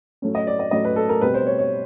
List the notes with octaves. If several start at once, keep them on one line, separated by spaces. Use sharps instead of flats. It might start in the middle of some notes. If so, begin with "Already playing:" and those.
A2 F#3 A3 C#4
D#5
D5
D#5
A2 F#3 A3 C#4 D#5
B4
A4
A#4
B2 G3 C4 B4
C5
C#5
C#5